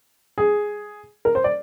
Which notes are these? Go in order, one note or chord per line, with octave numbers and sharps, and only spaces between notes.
G#4
A#4
C5
D5